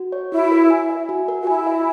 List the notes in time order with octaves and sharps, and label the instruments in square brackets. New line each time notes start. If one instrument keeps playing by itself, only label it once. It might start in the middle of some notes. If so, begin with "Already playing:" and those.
Already playing: [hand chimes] F#4
C#5
[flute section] E4 [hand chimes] F#4
[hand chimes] A#4
G#5
E5
F#4
A#4
[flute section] F#4
[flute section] E4 [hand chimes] G#5
[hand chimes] E5